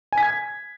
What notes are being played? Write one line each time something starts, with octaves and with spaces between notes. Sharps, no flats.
G#5
B6
G#6